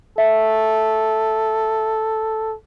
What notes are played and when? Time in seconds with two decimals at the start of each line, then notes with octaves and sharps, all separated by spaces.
0.18 A4 E5